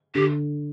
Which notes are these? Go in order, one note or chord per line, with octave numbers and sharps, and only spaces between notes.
D3 G4